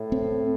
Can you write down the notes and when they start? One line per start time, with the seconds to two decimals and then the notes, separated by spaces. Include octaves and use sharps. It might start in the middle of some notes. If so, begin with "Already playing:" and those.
Already playing: A2
0.12 C4